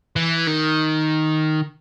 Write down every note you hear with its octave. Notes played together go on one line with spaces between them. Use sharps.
E3
D#3